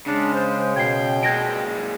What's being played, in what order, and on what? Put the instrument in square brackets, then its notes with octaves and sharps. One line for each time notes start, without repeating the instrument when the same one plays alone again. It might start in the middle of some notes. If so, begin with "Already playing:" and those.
[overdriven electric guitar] C#3 [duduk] G#3 [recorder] D4
[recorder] C5
[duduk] B2 [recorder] G5 [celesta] G#6 C7
[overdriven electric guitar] A#2 G#3 [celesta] G#6 A#6 D7